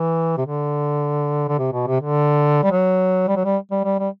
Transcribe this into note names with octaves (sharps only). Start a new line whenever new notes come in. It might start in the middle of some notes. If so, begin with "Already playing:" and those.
Already playing: E3
C3
D3
D3
C3
B2
C3
D3
G3
F#3
G3
F#3
G3
G3
G3
G3